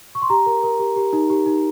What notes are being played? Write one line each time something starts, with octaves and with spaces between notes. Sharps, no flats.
C#6
C6
G4 A#5
A#4
A#4
G4
G4
D#4
G4
D#4